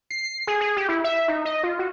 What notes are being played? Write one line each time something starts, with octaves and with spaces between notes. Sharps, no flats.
C7
G#4
G#4
G4
E4
E5
D#4
D#5
F4
F#4